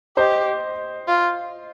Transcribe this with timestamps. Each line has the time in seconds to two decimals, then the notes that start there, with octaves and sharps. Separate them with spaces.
0.17 G4 C5 D#5
1.08 F4